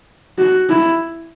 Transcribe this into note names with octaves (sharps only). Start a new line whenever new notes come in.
F#4
E4